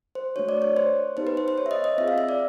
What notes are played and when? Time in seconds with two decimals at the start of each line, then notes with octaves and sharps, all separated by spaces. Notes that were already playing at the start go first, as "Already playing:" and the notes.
0.15 C5
0.36 A3 D4 F#4 C#5
0.49 D5
0.62 C#5
0.77 C5
1.17 B3 D#4 G4 C5
1.27 B4
1.37 C5
1.48 C5
1.58 C#5
1.66 E5
1.71 D#5
1.84 D#5
1.98 C4 F4 G#4 E5
2.08 F5
2.18 E5
2.29 D5